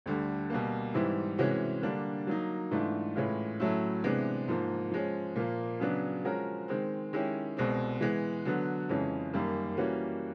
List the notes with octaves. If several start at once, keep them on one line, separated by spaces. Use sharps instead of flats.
D2 D3 G3
B2 G3 A#3
G#2 E3 G3 C4 E4
C3 E3 G#3 C#4 F#4
D3 G3 A#3 D4
F#3 A#3 D#4
G#2 E3 A3 D4 F4
A2 E3 G#3 C#4 F4
A2 F#3 A3 C#4 E4
C3 E3 G#3 B3 D4
G#2 F3 A#3
F3 G#3 C#4
A#2 F3 A#3
C#3 F#3 B3 D4
F3 G#3 C#4 F#4 A#4
D#3 G#3 C4
D#3 G#3 C#4 E4 G4
C2 B2 G#3 C4
E3 G#3 B3
D3 F#3 B3
F2 C#3 E3 G#3 C#4
F#2 D#3 G3 A#3
E3 G3 A#3 C#4 F#4